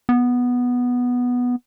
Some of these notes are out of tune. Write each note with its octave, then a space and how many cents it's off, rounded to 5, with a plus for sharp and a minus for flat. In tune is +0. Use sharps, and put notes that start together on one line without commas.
B3 -5